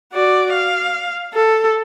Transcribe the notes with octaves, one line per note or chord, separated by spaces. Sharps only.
F#4 D5
F5
A4